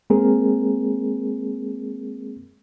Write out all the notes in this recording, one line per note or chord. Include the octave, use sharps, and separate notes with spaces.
G#3 A#3 C4 G#4 A#4